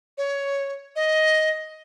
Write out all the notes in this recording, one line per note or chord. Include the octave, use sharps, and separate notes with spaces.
C#5
D#5